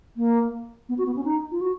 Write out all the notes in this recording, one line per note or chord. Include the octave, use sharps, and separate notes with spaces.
A#3
B3
F#4
B3
C#4
D#4
F4
F#4